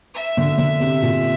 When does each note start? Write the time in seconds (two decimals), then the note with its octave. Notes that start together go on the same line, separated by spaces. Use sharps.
0.15 E5
0.37 D3
0.58 D3
0.80 C3
1.02 A#2